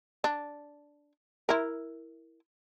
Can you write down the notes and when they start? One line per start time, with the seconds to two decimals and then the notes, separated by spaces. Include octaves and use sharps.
0.24 D4
1.49 E4 A#4